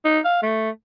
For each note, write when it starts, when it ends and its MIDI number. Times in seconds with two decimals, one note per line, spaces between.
0.05 0.20 63
0.25 0.42 77
0.43 0.70 57